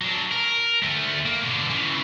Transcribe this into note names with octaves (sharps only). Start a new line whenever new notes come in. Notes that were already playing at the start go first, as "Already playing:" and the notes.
F#3 D4
A#4
D2 A3
A#3
B2 D3
C#3 E3